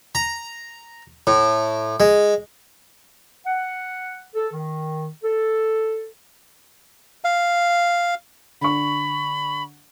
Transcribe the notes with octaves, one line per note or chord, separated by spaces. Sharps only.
A#5
A2
G#3
F#5
A4
D#3
A4
F5
D3 B5 C#6